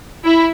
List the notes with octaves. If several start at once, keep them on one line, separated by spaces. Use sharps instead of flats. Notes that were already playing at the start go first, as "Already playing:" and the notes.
E4